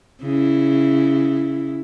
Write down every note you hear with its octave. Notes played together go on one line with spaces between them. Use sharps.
C#3 E4